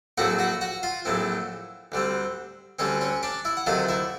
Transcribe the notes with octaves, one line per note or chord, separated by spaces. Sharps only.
A#1 A2 F#3 A3 C4 F#4 F#5
F#4 F#5
F#4 F#5
F4 F5
A#1 A2 F#3 A3 C4
D2 D3 G3 C4
D2 D3 G3 C4 C#4 C#5
C#4 C#5
D4 D5
E4 E5
F#5
D2 C3 D#3 F#3 A3 F4 F5
E4 E5